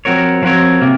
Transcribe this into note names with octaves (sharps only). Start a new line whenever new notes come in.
F3 C4 F#4 A#4 C#5
F3 C4 F#4 A#4 C#5
C3 A#3